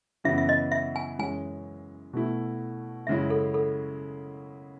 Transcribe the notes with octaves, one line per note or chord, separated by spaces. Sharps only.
F#2 C#3 E3 B3 E5
E5
D#5
E5
G#5
F#2 E3 G#3 C#4 G#5
B2 A3 E4
F#2 C#3 G#3 C#4 E4 E5
A4
A4